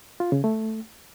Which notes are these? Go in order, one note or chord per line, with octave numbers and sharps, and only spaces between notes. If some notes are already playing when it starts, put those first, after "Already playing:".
F4
C#3
A3